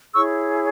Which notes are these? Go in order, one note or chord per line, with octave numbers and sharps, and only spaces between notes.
E4 G#4 C#5 C#6 E6